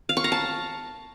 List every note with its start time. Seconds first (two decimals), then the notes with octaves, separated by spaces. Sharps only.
0.09 F5
0.17 C#6
0.24 A#5
0.32 A5